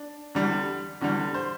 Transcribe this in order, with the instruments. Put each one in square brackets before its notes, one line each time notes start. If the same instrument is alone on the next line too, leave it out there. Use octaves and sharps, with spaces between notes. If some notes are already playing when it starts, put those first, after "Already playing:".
Already playing: [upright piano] D4
E2 D3 G3
E2 D3 G3
C5